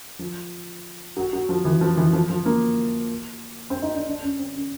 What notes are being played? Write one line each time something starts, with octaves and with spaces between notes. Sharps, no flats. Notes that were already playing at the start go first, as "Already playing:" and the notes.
F3
F#3
F#3
F3
E3
F3
E3
F3
F3
A#3
C4
D#4
D4
D4
C#4
C4
C#4